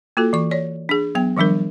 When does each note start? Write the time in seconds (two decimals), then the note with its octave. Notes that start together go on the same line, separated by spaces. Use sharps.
0.17 A#3 F4 F#4 A4
0.33 E3 C#6
0.51 C#5 D5
0.89 D4 G#4
1.15 F#3 B3 G5
1.37 D#3 F3 G3 D4 A#4